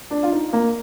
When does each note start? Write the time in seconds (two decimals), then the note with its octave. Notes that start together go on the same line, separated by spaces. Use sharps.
0.11 D4
0.23 F4
0.32 D#4
0.53 A#3